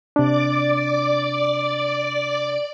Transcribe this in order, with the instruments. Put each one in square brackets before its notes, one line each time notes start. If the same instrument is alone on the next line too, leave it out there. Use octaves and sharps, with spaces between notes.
[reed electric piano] C3 D4 [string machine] D5 D6